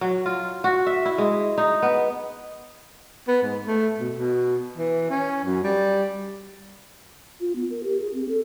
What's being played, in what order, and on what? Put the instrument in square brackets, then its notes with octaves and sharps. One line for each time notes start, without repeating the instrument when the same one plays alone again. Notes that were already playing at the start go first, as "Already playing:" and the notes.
[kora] F#3
F4
F#4
E5
E4
G#3
D#4
B3
[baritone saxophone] B3
G#2
A3
B2
B2
E3
C#4
F#2
G3
[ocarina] F4
B3
A#4
G4
G#4
C4
A4